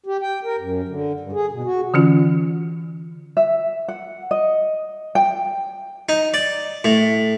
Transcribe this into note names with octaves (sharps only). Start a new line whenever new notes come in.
G4
G5
A#4
F#2
D3
G2
G#4
B2
F#4
D3 E3 C#4 F4
E5
F#5
D#5
G5
D#4
D5
A2